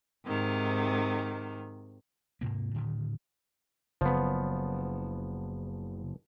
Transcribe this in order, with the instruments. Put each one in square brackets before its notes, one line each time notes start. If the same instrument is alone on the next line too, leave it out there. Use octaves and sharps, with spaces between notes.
[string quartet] G#2 C3 D#3
[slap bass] G#2 C3 A#3
A2 D3 D#3
[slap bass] F#1 [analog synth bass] C#3 [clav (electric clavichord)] F3 B3